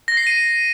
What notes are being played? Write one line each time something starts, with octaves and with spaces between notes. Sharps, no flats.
A#6
C7
D#7